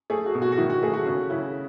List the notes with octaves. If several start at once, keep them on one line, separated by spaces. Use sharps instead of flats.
A3 G#4
F#4
B2
F#4
F#4
D#3 E4
F#4
A3 G#4
F#4
C#3 F#4
C#3 E4